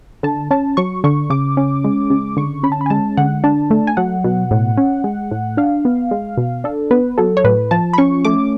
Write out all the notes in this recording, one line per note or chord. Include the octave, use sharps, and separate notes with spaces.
D3 A5
C#4 A5
F#3 C#6
D3 C#6
C#3 D6
C#4
G#3
C#3
D3 C#6
C#4 B5
A5
B5
G#5
G#3 A5
D3 F#5
D4 A5
A3
G#5
F#3 F#5
B2
A2
C#4
G#3
A2
D4 F5
B3
G#3
B2
D4 A4
B3 B4
F#3 A4
C#5
A2 B4
F3 A5
B5
C#4 C#6
A3 D6